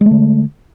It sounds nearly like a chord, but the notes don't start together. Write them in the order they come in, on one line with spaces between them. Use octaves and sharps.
G#3 A3 D3